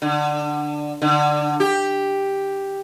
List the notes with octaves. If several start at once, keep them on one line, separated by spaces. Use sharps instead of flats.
D3
D3
G4